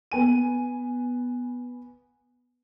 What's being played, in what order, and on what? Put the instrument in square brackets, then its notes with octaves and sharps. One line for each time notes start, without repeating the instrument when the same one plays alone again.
[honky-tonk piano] B3 G#5 D#7